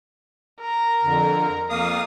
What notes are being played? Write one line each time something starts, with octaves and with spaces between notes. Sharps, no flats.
A#4
F2 D3
F2 A#3 F5 D#6